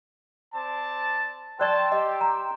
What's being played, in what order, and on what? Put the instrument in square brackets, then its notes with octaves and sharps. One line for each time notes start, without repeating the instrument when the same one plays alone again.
[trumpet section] C4 D5 A5
[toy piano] C5 D5 C#6 [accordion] G5 C6 E6 [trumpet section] A5
[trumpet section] G4 [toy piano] D#5
[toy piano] A#5